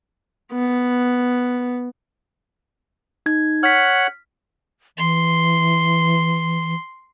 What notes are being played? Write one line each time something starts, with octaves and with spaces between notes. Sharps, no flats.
B3
D#4 G#6
C#5 F#5 F6 F#6 B6
E3 C6